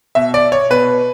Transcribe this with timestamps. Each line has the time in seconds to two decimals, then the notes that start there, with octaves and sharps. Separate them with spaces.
0.15 B2 E5
0.34 D5
0.52 C#5
0.70 B2 B4